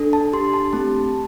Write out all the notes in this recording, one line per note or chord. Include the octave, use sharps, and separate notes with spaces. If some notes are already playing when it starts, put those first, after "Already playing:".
Already playing: D4 A4
A5
D4 G4 C6
A5
A3 C4 G4 A5